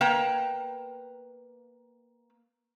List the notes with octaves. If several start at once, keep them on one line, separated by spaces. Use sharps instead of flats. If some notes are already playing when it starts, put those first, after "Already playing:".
A#3 B4 G5 A#5